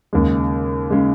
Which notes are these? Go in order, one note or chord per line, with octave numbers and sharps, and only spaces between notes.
D#2 C#3 G#3
C#3 G#3